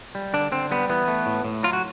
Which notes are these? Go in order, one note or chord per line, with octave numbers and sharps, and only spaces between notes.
G3
D3 D4
D3 C4
G3 B3
E3 B3
A3
A2
A2
F#3 F4
F#4